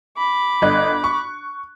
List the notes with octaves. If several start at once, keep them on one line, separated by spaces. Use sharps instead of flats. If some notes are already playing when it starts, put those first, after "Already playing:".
B5 D6
G1 D#5 F#6
C#6